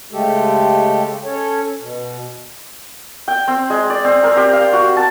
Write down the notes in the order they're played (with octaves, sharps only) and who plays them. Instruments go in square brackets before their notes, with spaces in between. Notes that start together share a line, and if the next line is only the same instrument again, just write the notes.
[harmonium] C#3 G#3 A3 G4 A4
C#4 A4 C#5
B2
[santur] G5
C4
G#3
D5
C4
A#4
G4
F5
F#4
A5